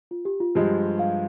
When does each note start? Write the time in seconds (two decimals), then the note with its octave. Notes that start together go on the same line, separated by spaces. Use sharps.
0.11 F4
0.25 G4
0.40 F4
0.55 G2 F3 G#3 G4
0.99 F5